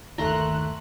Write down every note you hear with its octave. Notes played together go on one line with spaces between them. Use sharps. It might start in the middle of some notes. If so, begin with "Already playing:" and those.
G1 D#2 D#3 A3 A#5 C6 F#6